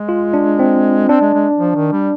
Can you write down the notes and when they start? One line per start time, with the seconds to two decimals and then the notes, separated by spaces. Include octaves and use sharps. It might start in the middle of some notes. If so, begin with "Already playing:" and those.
Already playing: G#3
0.09 F4
0.34 D4
0.59 C4
1.09 C4 D4
1.22 G#3
1.34 G#3
1.59 F3
1.76 D#3
1.92 G3